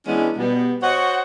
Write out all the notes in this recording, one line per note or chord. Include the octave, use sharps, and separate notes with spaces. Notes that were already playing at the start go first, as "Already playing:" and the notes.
E3 G#3 B3 C#4 D4 E4
B2 G3 B3
F#4 C5 C#5 D#5 F#5